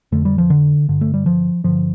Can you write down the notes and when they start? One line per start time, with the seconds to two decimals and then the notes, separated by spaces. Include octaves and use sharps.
0.12 F2 D3 A3
0.25 G3
0.38 F3
0.50 D3
0.88 G2 D3
1.01 A3
1.14 G3
1.26 F3
1.64 G2 D3 F3